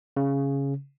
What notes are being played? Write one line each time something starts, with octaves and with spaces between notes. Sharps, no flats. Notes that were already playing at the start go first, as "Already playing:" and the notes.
C#3